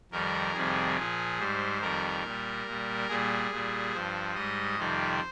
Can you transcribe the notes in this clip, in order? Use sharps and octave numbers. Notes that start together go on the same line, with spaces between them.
F2 D#3 G3 A#4
F2 C3 D#3 G3 G#4
A#2 F3
G#2 G3 C5
F2 D#3 G3 A#4
A#2 G3
A#2 G3
A#2 G3 G#4
A#2 G3
G2 F3 C5
G#2 G3 D#5
F2 C3 D#3 G3 C5